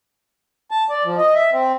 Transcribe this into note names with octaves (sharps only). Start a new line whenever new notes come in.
A5
D5
F3
D#5
E5
C4